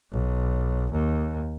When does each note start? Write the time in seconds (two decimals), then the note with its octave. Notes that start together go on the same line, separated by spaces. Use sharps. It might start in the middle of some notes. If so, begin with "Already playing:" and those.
0.11 B1
0.92 D#2